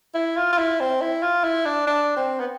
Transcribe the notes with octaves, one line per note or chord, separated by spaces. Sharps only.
E4
F4
F4
E4
C4
E4
F4
E4
D4
D4
C4
B3